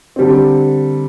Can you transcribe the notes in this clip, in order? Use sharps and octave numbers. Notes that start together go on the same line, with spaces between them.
D3 G3 C4